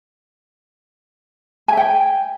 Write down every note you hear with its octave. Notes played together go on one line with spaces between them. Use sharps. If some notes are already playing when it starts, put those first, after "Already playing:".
E5 G5 G#5